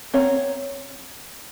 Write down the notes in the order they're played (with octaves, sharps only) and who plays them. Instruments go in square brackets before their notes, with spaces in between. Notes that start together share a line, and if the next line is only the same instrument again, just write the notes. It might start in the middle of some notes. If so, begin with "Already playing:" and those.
[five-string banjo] C4 C#5 F#5 A#5